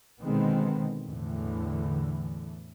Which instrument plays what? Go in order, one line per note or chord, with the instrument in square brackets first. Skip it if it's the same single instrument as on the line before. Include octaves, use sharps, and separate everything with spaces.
[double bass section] B2 D3 D#3 G#3 B3 C4
E2 A2 D3 E3